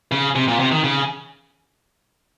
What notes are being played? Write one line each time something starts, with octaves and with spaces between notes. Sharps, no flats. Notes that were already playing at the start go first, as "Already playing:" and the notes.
C#3
C3
A#2
C3
D#3
C#3